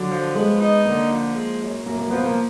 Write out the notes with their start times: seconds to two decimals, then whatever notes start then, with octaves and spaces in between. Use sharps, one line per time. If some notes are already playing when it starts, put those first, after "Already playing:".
Already playing: D3 F#3
0.11 F3
0.35 G#3 B3
0.60 D#4
0.85 D3 A#3
1.10 F3
1.35 G#3
1.61 F#2
1.85 F#2 A#3
1.98 A#3
2.10 F3 B3
2.23 A#3